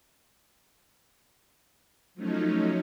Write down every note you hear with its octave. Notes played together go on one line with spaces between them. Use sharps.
F3 F#3 A3 C#4 D#4